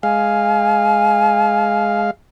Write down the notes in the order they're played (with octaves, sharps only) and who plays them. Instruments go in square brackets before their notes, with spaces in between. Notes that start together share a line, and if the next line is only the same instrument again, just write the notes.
[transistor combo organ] G#3 F5 [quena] G#5